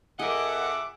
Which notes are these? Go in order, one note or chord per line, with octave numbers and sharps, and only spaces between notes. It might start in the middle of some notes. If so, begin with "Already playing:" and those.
F2 G#4 A#4 D#5 E5 F#5 D6